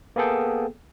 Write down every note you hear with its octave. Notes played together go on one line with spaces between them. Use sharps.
A#3 B3 G#4 A4 G5